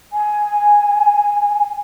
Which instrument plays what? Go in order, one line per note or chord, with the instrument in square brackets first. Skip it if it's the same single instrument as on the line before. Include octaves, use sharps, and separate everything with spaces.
[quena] G#5